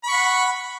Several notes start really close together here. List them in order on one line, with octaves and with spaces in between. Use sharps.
B5 C#6 F#5